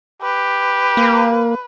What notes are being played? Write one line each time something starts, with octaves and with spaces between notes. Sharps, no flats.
G4 B4
A#3